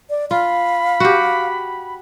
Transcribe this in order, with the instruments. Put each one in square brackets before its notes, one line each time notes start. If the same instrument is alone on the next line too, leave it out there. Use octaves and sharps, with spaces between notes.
[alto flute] D5
[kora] F4 [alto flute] F5 [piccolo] B5
[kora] F#4 G4